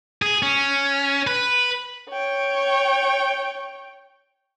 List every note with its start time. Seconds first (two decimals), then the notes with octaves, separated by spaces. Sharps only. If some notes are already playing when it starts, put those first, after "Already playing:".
0.22 G#4
0.43 C#4
1.27 B4
2.10 C#5 G5